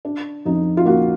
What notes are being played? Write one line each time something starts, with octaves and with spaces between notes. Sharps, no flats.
D4
F2 D#4
F4
A#3 F#4